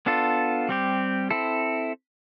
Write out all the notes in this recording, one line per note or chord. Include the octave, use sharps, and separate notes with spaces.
B3 D4 F4 A4
G3 C4 G4
C4 E4 A4